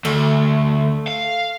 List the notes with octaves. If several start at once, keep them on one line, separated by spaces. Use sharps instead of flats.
D2 A3
F5